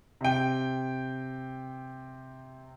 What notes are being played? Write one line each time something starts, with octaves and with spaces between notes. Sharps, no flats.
C3 G5